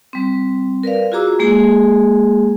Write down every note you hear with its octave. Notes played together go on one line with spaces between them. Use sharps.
G3 C4
A#4 B4 D5 F5
F4 F#4 G#4 A#5 D6 E6
G#3 A#3 G#4 G#5